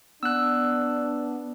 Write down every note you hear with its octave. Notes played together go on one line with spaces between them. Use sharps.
B3 D4 E6 F#6